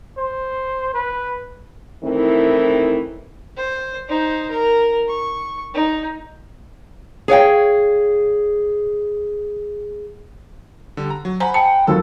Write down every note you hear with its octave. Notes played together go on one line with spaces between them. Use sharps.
C5
B4
D#3 E3 A3 C4 E4
C5
D#4 C5
A#4
C#6
D#4
G#4 C#5 F5 G5
D3 G3
A#5
F#3
C5 F#5 G#5 A#5 B5
G5 A5 C#7
D#2 F3 F#3 A4 E6